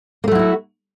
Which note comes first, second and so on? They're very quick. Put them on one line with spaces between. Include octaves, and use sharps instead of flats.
A#3 A3 F#3 E4 F#4